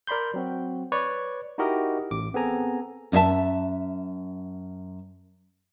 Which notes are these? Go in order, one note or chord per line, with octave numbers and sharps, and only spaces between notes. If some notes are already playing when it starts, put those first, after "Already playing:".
A#4 D5 B5 C6 G6
F#3 C4 F#4
B4 C#5 D5 C#6
D#4 E4 F#4 G4 A#4 D#5
A1 D6
B3 C4 G#4 A4 G#5 A#5
F#2 D#4 A4 E5 A5